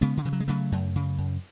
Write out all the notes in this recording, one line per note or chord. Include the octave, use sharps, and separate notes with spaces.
C#3 G#3 B3
D3
C#3 E3
F#3
G#3
C#3 F#3 A3
F#2
C#3
F#2